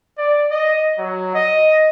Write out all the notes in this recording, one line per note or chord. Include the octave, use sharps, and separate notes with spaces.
D5
D#5
F#3
D#5